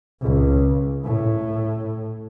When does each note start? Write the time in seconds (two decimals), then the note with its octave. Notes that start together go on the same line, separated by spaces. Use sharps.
0.22 C#2
1.05 A2